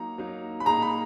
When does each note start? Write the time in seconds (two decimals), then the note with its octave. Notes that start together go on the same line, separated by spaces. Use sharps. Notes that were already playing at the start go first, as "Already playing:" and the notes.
Already playing: F#3 A#3 D#4 A#5
0.18 F#3 A#3 D#4
0.60 B5
0.66 A#2 A#3 D#4 G#4 A#5
0.82 B5